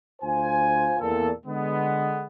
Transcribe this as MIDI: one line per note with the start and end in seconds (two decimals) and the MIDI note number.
0.22 0.95 38
0.22 0.95 65
0.22 0.95 72
0.22 0.95 80
1.00 1.30 40
1.00 1.30 46
1.00 1.30 69
1.45 2.26 50
1.45 2.26 56
1.45 2.26 59